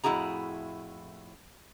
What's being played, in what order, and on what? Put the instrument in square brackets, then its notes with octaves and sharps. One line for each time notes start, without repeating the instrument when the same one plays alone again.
[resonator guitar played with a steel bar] F2 A2 E4 F#4 G#4 A#5